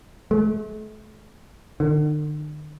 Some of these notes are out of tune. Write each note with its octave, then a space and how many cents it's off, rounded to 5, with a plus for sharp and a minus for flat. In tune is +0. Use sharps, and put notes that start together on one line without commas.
A3 -45
D3 +45